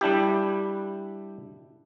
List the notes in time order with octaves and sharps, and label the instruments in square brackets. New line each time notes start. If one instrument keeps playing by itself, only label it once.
[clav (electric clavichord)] G3 D4 E4 G4